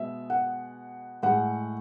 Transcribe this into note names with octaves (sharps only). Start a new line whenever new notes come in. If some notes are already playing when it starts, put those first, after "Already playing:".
Already playing: B2 G#3 E5
F#5
A2 G#3 F#5